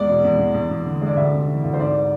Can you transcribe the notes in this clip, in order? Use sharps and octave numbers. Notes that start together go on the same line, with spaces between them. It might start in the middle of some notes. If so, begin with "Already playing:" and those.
Already playing: E2 G#3 D5
B2
E2
E2
E2
E2
D3
G#3
D5
D2 E5
C3
E3
D2
C5
G#2 D5